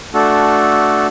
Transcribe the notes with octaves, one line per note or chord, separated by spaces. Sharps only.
A3 D4 F#4 A4